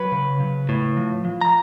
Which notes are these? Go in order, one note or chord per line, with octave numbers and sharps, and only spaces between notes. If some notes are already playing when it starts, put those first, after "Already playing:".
Already playing: F#3 B4 B5
C#3
C#3
A2
F3
F3
A#5